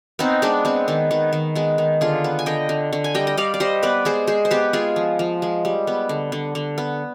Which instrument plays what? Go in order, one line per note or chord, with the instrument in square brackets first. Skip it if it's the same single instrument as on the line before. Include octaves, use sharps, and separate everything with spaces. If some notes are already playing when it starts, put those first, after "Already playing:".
[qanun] B3 C4 D#4
G#3 B3 D4
B3 C4
D#3 B3
D#3 B3
D#3
G#3 B3
D#3
D3 F4 G#4
B3
G#5
D3 D#5 G5
D3
D3
G#5
G3 D#5 G5
D#5
G3 D5 F5
D5
G3 C5 D#5
B3 B4 D5
G#3 G#4 C5
G#3 G#4 C5
C5
B3 G4 B4
G#3 F4 G#4
F3
F3
G#3
G3
B3
D3
D3
D3
B3